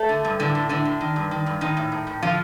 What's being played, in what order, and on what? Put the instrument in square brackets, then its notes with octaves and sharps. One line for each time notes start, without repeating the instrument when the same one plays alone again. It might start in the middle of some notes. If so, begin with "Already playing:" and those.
Already playing: [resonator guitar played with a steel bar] A3 A4
D3
G2
A2 D3 D4
A2
A2 D3 D4
A2
D#3
G2
D#3
G2
A2 D#3 D#4
A2
A2
A2
D3 F3 F4